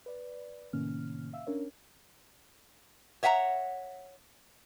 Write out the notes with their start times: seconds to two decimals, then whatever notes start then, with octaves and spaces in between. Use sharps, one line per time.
0.06 B4 D5
0.73 A2 C3 D#3 A#3 C#4 F6
1.33 E5 F5 E6
1.47 C#4 D4 A#4 C#5
3.23 C#5 E5 F#5 G5 A#5